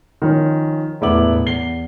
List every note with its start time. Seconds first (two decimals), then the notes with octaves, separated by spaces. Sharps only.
0.22 D#3 F3 C#4
1.01 E1 A2 B3 E4 D6 F#7
1.46 E2 C7 G7